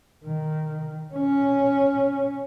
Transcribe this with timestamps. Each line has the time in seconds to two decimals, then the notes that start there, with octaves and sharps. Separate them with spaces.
0.25 D#3
1.14 C#4